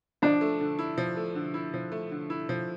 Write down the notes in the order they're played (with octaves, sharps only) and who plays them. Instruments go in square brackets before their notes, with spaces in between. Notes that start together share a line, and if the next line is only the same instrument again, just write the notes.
[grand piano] F3 [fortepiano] D4
[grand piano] A3
D3
E4
F3
A3
D3
E4
F3
A3
D3
E4
F3